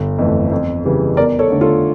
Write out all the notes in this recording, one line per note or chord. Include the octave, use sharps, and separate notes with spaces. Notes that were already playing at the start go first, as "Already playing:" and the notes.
Already playing: G1
F2 E3 A3
F2
C#3 E3 G3
E2 A#4 D5
A4 C#5
D3 A3
F4 A4